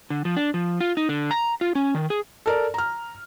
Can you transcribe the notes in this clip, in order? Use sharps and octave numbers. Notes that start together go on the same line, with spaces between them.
D3
F3
D4
F3
F4
D#4
D3
A#5
F4
C#4
D#3
G#4
A4 A#4 D5
A#5 F6